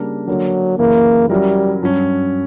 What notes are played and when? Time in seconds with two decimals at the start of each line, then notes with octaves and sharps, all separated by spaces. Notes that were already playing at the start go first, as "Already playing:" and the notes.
Already playing: C#3 G3 A#3 D4 A#4
0.27 D3 F#3 A#3 D4 A#4
0.79 F#2 C#3 E3 A#3
1.30 F#3 G3 C#4 E4 A#4
1.82 G2 F#3 C#4